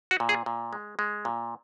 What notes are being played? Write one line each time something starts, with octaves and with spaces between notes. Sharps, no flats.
F#4
A#2
G#4
A#2
G#3
G#3
A#2